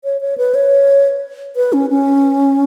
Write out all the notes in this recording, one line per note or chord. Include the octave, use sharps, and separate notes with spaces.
C#5
C#5
B4
C#5
B4
C#4
C#4